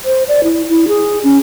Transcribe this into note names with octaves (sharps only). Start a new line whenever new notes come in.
C5
D5
E4
E4
G#4
C#4